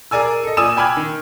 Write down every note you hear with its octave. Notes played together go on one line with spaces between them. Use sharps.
G#4 A#4 D5 G#5 E6
A4 D#5
A#2 D5 G#5 D#6 E6 E7
G5 G#5 B5 D6 F6 G#6
D#3